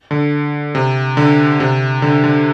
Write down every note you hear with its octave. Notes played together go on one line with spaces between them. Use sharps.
D3
C3
D3
C3
D3
D3